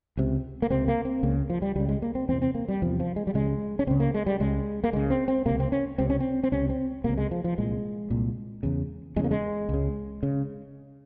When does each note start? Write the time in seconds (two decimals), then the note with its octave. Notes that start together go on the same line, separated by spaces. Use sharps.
0.17 C#2 C3
0.62 A#3
0.70 C#2 C3 C4
0.88 A#3
1.05 C4
1.23 C#2 C#3 A#3
1.50 F3
1.62 G3
1.76 C#2 C#3 G3
1.89 G#3
2.02 A#3
2.15 C4
2.29 E2 C4
2.33 C3
2.42 C4
2.55 A#3
2.68 G3
2.82 E2 C3 F3
3.00 F3
3.16 G#3
3.27 G3
3.34 C#2 C#3 G#3
3.79 C#4
3.87 C#2 C#3 C4
4.00 A#3
4.14 G#3
4.26 G3
4.40 C#2 C#3 G#3
4.84 A#3
4.93 C#2 C#3 G#3
5.10 C4
5.28 C4
5.46 C#2 C3 A#3
5.60 C4
5.72 C#4
5.98 C#2 C3 C4
6.10 C#4
6.20 C4
6.43 C4
6.52 C#2 C3 C#4
6.69 C4
7.04 C#2 C3 A#3
7.18 G#3
7.31 F3
7.44 F3
7.58 C2 A#2 G#3
8.10 C2 A#2
8.63 E2 C#3
9.16 E2 G#3
9.19 C#3
9.24 A#3
9.31 G#3
9.69 C#2 C#3
10.23 C#3